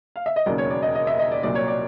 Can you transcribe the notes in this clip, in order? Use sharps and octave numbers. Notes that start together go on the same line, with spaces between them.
F5
E5
D#5
E1 D#2 C#3 F#3 D5
C#5
D5
D#5
D#5
E5
D#5
D5
C2 A#2 F#3 D5
C#5
D5